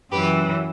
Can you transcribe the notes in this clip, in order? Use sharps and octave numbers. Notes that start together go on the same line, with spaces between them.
F#2 E3 G4 B4